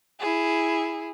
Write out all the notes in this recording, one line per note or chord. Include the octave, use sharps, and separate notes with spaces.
E4 G#4